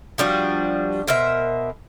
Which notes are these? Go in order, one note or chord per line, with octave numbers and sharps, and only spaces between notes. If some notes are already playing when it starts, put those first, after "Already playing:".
F3 G3 D4 F#4
B2 A#4 C5 E5